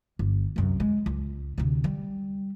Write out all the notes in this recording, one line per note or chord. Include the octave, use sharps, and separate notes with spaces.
G1
C2 F#2
G#3
C#2
D2 C3
G3